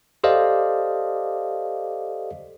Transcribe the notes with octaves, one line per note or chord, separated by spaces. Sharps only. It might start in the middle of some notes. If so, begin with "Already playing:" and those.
G4 A4 C5 D5 D#5 F5